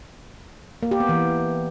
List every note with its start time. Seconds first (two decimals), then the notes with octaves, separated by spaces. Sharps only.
0.83 A#3
0.91 G4
1.00 B3
1.09 E3